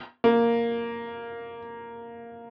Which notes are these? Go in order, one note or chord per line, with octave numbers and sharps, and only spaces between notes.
A#3